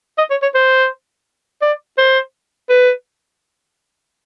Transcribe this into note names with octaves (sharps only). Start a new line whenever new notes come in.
D#5
C#5
C#5
C5
D5
C5
B4